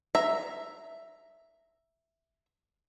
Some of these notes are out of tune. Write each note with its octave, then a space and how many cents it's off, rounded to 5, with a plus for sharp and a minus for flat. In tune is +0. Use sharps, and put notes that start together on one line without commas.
E5 +0 A#5 +0